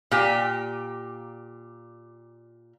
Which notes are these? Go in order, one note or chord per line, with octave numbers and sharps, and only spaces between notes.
A#2 G4